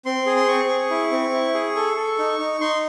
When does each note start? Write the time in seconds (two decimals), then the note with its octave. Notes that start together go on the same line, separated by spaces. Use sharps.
0.05 C4 C6
0.26 G#4
0.36 C6
0.48 C4 C#6
0.69 G#4
0.91 E4
1.12 C4
1.33 E4
1.54 G#4
1.76 A4
1.97 A4
2.18 D#4
2.39 D#4
2.61 D#4 C6